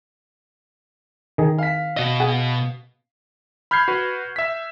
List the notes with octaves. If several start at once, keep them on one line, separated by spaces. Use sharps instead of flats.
D#3 G#4
F5 B6
B2 D#5
G#4 F#5
B5 F6 G6 G#6 C7
F#4 B4
E5 B6